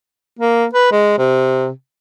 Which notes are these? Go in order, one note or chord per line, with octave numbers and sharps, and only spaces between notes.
A#3
B4
G#3
C3